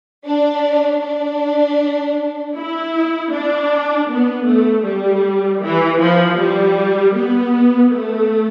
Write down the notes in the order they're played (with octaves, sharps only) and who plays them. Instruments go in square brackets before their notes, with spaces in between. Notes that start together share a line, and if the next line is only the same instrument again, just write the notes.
[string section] D4
D4
E4
D4
B3
A3
G3
E3
F3
G3
B3
A3